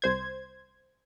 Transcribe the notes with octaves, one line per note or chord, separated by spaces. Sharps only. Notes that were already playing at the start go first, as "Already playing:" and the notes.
C2 C5 G#6